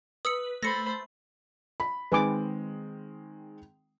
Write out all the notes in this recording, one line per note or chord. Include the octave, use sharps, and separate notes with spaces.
B4 D#6 E6 C#7
A3 C5 B5 A#6 C#7
B5
D#3 G#3 C4 B4 G#5 D6